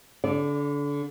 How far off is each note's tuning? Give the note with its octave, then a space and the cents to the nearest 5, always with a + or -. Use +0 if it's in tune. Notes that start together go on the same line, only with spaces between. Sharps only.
D3 -30 D5 +0